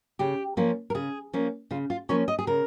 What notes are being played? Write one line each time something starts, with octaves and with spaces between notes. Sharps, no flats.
C#3 G4
F3 A#3 C#4
A#4
C#3 G#4
F3 A#3 C#4
C#3 F4
F4
F3 A#3 C#4 C#5
D#5
G#4
C#3 A#4